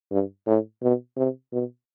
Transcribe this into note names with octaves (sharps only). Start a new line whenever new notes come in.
G2
A2
B2
C3
B2